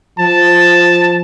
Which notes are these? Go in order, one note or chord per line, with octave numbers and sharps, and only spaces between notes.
F3 A5